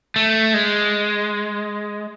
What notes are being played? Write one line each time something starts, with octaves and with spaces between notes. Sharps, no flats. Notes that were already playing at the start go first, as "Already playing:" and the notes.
A3
G#3